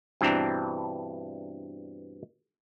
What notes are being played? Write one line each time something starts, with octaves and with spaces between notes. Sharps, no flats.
G2 B2 E3 C4 D4 A#5